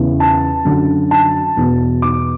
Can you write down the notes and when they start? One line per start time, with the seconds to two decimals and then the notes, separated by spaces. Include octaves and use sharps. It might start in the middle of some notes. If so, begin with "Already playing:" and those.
Already playing: E2 C#3 E3
0.20 A5
0.65 F#2 D3
1.11 A5
1.57 E2 B2
2.02 D6